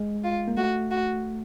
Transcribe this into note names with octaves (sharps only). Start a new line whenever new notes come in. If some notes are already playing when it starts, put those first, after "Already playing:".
Already playing: G#3
F4
A#3
A3 F#4
F#4